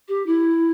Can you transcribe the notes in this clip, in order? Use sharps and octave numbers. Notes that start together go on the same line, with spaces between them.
G4
E4